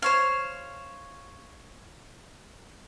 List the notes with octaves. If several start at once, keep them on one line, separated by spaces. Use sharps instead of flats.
C5 C#5 F5